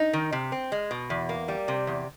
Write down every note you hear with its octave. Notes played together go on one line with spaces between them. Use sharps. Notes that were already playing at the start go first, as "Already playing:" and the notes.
Already playing: D#4
D#3
C3
C4
G#3
B2
E2
A#3
G3
C3
E2